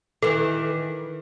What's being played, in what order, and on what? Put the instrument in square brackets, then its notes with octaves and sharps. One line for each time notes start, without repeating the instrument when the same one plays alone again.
[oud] D#3 E3 [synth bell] A4